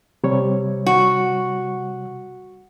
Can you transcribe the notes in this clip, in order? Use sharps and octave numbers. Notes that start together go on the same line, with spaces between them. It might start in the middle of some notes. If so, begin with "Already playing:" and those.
C3 G3 C#5
F#4